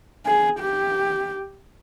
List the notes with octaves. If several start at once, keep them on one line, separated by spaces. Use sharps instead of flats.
G#4
G4